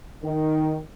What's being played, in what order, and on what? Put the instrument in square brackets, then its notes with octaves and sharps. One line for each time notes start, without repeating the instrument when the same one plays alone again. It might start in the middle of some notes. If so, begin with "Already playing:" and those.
[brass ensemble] D#3